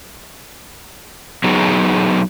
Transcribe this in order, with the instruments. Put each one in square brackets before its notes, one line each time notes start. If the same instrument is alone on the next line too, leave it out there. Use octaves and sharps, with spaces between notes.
[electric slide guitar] F#3 B3 D#4 G#4